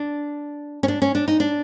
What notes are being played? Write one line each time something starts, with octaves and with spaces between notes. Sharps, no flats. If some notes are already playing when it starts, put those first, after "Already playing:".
Already playing: D4
C#4
D4
C#4
D4
D#4
D4